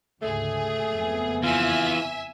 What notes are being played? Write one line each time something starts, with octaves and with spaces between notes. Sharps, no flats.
D2 G#2 C#3 A3 G#4
F#1 F2 B3
E2 E3 F4 E5 G#5